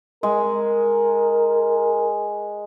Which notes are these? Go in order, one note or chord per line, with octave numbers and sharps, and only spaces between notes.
G#3 A#4